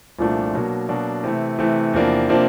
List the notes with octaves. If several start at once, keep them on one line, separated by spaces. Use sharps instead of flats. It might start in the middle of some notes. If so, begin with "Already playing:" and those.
C2 A#2 F3 A3 D4
B2 F#3 A#3 D4
B2 F#3 A#3 D4
C3 E3 A3
C3 E3 A3
E2 C3 F3 A#3 D4
C3 F3 A#3 D4